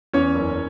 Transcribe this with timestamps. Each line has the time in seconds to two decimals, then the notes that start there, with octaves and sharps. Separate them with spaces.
0.13 E2 C#4 C#5
0.35 F#1